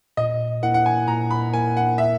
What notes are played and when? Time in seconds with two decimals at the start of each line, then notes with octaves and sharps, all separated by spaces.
0.17 A#2 D#5
0.62 A#3 E4 A#4 F#5
0.74 F#5
0.86 G#5
1.07 A#2 A#5
1.30 B5
1.54 A#3 E4 A#4 G#5
1.77 F#5
1.98 E5